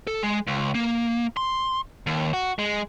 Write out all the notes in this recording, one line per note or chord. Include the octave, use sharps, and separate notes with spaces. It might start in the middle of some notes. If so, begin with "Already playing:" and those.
A4
G#3
C#2
A#3
C6
D#2
F#4
G#3